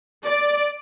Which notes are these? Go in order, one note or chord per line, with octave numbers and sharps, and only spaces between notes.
D5